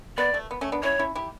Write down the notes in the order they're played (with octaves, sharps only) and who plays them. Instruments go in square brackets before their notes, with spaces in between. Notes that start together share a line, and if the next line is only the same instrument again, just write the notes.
[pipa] B3 [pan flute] D5
[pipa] A3
B3
A3 C#4
B3 D4
[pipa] C#4 E4 [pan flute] C#5
[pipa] C#4 E4
E4 G4